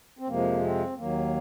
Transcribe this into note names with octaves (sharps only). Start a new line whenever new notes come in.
C4
F2 C3 F3 G#3 A#3
C4
D#2 D#3 F#3 A#3